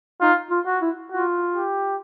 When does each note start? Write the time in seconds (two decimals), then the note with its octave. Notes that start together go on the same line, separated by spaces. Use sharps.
0.21 D#4 F4
0.51 F4
0.66 F#4
0.82 E4
1.11 F4 F#4
1.55 G4